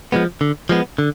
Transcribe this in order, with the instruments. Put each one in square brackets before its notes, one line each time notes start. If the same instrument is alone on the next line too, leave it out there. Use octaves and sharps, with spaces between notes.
[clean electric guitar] F3 G#3 B3
D3
F3 G#3 B3
D3